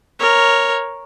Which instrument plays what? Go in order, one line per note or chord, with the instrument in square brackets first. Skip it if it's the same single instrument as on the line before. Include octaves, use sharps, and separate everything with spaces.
[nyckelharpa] A#4 C#5